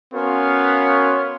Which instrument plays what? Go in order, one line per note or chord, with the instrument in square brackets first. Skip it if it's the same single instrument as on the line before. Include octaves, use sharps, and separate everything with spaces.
[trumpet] B3 [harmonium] C#4 F#4 A#4 [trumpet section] B4 C#5 C6 [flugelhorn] F5